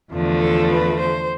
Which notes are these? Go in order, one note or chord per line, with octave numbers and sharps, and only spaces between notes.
E2 D3 F3 A3
A4
B4
C5